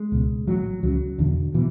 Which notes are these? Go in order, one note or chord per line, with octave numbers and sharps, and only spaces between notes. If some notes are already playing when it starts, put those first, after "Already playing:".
Already playing: G#3
C#2 B2
A1 A2 F#3
C#2 C#3 F#3
E1 E2 D3
B2 E3